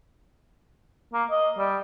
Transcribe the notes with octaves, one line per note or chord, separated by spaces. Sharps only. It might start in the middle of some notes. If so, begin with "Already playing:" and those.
A#3
D#5
G3